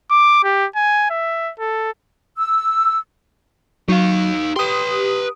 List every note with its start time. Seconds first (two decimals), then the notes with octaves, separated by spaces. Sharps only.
0.11 D6
0.43 G4
0.76 G#5
1.10 E5
1.59 A4
2.37 E6
3.88 F#3 D#4 F5
4.56 G4 B4 C6 D#6